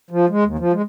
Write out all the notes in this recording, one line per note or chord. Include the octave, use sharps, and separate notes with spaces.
F3
G#3
D#2
F3
G#3